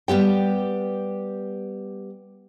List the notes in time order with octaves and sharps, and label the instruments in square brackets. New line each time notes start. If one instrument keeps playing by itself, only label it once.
[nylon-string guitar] G3 B3 G4 G5